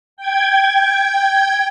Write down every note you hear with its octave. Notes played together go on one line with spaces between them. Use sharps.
G5 G#6